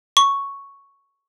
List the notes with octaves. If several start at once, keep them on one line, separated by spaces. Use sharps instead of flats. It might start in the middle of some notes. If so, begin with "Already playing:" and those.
C#6